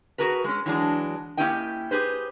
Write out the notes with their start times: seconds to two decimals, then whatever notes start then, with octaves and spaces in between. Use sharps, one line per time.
0.18 F#4 G#4 A#4 B4
0.44 G#3 C#4
0.66 E3 F#3 G#3 D4
1.37 A#3 C#4 E4 G4 D#5 G5
1.91 G4 G#4 B4 C5